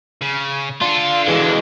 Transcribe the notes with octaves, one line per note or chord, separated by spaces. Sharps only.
C#3
D4 F4 A4
E3 G#3